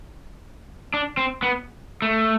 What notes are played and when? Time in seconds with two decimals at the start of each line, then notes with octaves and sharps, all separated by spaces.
0.94 D4
1.17 C4
1.43 B3
2.02 A3